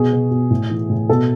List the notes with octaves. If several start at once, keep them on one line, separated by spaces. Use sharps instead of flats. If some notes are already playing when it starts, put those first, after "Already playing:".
Already playing: B2 G#4
B2
B2
A2
E3
A2
B2 A4